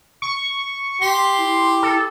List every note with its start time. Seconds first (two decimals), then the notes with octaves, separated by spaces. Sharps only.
0.22 C#6
1.01 G4 C6
1.38 E4
1.83 A4